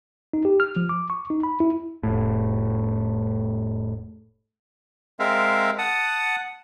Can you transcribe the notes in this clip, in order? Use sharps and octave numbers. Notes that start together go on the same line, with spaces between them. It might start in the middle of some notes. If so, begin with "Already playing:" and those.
D#4
G4
F6
F3
D6
C#6
D#4
B5
E4
F1 A2
G#3 C4 A#4 E5 F5
F#5 A5 D#6